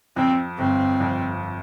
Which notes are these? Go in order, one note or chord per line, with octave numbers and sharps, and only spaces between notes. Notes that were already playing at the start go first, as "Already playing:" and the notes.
F2 C4
G1 C4
F2